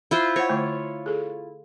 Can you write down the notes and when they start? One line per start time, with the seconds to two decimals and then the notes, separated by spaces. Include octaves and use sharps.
0.11 E4 F4 C5
0.36 C5 C#5 F#5
0.50 D3 A3
1.06 G#4 A4